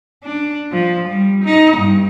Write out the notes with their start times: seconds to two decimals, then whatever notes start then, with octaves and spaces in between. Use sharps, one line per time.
0.24 D4
0.72 F3
1.08 G3
1.44 D#4
1.77 G2